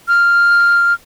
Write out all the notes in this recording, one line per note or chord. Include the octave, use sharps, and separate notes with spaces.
F6